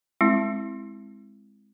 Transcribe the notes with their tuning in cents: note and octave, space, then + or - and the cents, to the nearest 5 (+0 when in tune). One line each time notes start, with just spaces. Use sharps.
G#3 +0 C4 +0 E4 +0